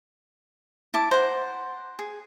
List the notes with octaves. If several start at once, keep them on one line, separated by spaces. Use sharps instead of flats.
E4 A5 D6
C5 F#5 A#5
G#4